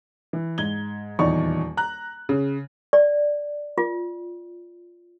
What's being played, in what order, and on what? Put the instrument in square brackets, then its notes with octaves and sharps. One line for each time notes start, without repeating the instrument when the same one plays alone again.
[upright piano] E3
G#2 G#6 G7
D#1 E2 D#4 D5 C#6
A#5 F#6
C#3
[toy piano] D5
F4